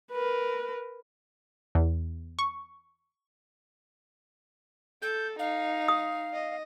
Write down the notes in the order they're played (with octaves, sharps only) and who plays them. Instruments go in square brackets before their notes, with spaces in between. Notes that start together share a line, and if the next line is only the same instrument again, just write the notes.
[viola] A#4 B4
[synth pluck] E2
C#6
[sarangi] A4 [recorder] G6
[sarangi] D#4 [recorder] F5
[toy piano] D#6
[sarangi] D#5